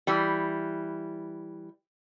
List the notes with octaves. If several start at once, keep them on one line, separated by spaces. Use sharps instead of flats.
E3 G3